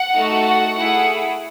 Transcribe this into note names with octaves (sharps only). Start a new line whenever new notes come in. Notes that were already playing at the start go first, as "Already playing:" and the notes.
Already playing: F#5
A3 D#4 F#4 A4
F#5
A3 E4 G#4 F#5